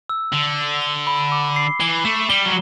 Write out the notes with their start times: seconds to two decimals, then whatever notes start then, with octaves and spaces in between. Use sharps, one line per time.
0.09 E6
0.33 D3 G7
0.58 G7
0.82 G7
1.07 B5
1.32 D6
1.56 C7
1.80 E3 G7
2.05 A3 E7
2.30 G3 G7
2.45 F#3